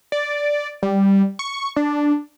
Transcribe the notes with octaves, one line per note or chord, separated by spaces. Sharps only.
D5
G3
C#6
D4